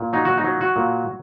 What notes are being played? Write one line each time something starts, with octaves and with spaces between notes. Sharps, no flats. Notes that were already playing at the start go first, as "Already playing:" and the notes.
Already playing: A#2
F#3 D#4
F#4
D#4
F#3
F#4
A#2